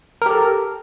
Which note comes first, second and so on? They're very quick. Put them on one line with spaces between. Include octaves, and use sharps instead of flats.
A#4 G4 A4